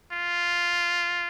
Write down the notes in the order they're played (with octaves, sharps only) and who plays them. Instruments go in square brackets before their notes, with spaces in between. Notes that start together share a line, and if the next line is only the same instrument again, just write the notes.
[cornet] F4